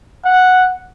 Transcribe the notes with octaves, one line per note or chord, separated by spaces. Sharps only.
F#5